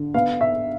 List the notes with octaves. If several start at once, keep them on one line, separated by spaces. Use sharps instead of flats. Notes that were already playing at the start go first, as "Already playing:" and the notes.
Already playing: D3
B3 F5
E5